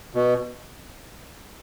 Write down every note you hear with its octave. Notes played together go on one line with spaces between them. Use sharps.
B2